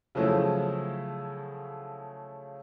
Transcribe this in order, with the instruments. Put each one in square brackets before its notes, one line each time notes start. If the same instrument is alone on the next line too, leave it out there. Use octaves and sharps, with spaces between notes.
[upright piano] C#3 F3 F#3 A3 E4